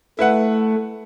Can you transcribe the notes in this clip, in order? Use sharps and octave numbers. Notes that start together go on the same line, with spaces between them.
A3 E4 B4 F#5